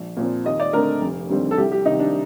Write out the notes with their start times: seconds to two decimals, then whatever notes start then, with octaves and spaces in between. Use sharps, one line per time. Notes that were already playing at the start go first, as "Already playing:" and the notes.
Already playing: A#1
0.17 A#2 F3 C4
0.45 D#2 D#5
0.60 D5
0.73 D3 A3 C4 A#4
1.01 F1
1.29 D#2 D3 G3 C4
1.51 A4
1.58 C2 G4
1.72 G4
1.85 C3 D#3 D#4
1.99 D4